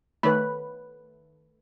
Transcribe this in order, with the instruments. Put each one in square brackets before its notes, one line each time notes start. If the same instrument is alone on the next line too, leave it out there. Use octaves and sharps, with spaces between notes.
[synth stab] D#3 A3 [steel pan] B4 C#5 B5